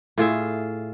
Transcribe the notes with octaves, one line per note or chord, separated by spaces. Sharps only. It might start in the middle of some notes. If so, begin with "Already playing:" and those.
A2 F4 G#4 E5